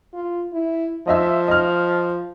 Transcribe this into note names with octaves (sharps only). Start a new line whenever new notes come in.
F4
E4
F3 D#5 E5 E6
D#5 F6